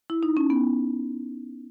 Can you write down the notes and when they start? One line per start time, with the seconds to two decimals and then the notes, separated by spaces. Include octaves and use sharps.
0.10 E4
0.23 D#4
0.37 C#4
0.50 B3